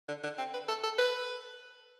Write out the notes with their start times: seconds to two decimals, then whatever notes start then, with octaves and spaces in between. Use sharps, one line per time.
0.08 D3
0.23 D3
0.38 C4
0.54 B4
0.68 A4
0.84 A4
0.98 B4